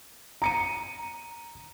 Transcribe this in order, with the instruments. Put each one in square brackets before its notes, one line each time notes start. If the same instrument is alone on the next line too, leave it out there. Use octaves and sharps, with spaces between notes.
[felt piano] A#5 C#7 D#7